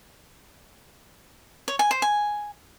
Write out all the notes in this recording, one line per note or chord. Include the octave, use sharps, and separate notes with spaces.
C#5
G#5
C5
G#5